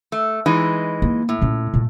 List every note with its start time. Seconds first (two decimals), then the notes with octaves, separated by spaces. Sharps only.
0.12 A3
0.46 E3 G#3 D#4
1.02 A#3
1.29 A2
1.41 A#2 C#4
1.74 G2 A#2